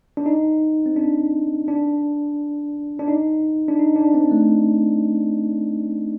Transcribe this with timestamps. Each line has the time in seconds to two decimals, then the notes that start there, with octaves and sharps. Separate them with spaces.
0.17 D4
0.26 D#4
0.86 C4
0.96 D4
1.68 D4
2.99 D4
3.08 D#4
3.68 D4
3.79 D#4
3.96 D4
4.14 C4
4.31 A3